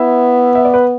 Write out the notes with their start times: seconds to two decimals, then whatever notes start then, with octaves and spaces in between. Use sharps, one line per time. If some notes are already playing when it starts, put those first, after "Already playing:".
Already playing: B3 E4 E5
0.55 E5
0.65 D5
0.74 B4